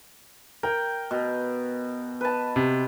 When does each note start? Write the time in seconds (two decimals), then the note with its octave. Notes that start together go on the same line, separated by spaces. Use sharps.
0.63 A#4 G5
1.11 B2
2.21 B4 A5
2.56 C3